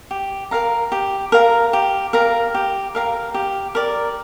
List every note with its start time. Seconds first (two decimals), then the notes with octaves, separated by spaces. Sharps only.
0.11 G4
0.51 A#4 F5 A#5
0.92 G4
1.32 A#4 F5 A#5
1.73 G4
2.13 A#4 F5 A#5
2.55 G4
2.95 A#4 F5 A#5
3.34 G4
3.75 A#4 D5